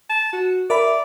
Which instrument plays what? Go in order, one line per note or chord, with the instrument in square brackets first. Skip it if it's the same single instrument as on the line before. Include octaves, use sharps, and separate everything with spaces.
[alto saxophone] A5
F#4
[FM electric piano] A#4 E5 B5 [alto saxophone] D5